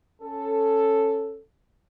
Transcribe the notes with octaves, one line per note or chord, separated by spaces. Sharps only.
C#4 A4